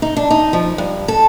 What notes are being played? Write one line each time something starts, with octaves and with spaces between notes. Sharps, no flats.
D#4
D4
D#4
F3
G2
A4